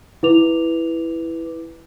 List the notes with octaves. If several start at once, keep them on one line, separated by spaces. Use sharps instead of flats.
E4 B4 D6 F7